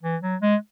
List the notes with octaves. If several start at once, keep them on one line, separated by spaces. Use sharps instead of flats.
E3
F#3
G#3